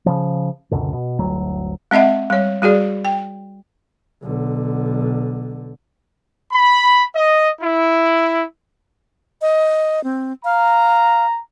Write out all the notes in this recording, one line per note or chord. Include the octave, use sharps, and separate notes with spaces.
C#3 F3
C#2 F#2 B2 D3
B2
D1 G1 D2 F#3
G#3 C4 D#5 E5 F#5
G3 C#5
G3 F#4 G#4 D5
G5
B1 D3
B5
D#5
E4
D#5
C4
F5 A#5